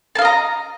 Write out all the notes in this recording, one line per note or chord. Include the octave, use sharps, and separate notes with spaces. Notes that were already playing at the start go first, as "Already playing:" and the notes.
D#5 F5 A5 A#5